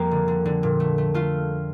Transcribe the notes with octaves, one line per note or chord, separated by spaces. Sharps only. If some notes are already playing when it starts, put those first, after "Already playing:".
Already playing: F2 G3 A#3
D3
D3
D3
A#2
A3
A3
A3 F4